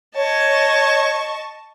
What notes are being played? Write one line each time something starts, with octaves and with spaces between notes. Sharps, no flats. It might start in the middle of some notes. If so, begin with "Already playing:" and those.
C#5 D#5 A5 C#6